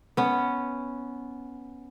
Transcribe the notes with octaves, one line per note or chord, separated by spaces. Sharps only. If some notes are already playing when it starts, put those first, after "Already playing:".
B3 C#4